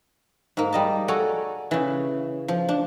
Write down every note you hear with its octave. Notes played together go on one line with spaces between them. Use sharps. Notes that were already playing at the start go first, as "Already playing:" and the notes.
G#2 A#3
G3 D#5 A5
F#4 A4 C#5 D5 G#5 A#5
C#3 E3
F3
D4